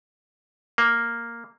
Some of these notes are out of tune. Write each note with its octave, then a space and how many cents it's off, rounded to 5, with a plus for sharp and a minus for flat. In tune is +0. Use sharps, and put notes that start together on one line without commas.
A#3 -5